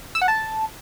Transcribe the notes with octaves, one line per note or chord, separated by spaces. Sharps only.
E6
F#5
A5